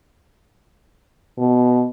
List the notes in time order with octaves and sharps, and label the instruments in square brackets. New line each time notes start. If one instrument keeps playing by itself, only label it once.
[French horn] B2